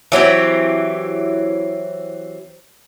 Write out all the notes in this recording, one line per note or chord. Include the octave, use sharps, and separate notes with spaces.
E3 F#3 C4 G4